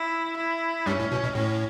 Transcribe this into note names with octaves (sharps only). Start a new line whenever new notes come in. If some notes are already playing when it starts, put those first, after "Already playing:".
Already playing: E4
E4
G2 G3 C#4
A2
B2
B2
A2 C#4